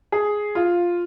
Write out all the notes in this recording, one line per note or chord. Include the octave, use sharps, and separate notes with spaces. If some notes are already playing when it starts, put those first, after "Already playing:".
G#4
F4